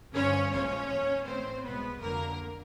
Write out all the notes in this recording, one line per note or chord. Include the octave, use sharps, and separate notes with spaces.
G1 G2 D3 F3 C#4 C#5
A#1 A2 F3 G#3 C#4 C#5
D#2 D#3 F#3
A1 A2 E3 A3 C4 C5
C2 B2 G#3 B3 B4
F2 D3 F#3 A#3 A#4